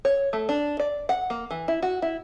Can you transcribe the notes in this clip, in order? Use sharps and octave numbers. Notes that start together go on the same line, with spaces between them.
C#5
A3
D4
D5
F#5
A#3
E3
E4
F#4
E4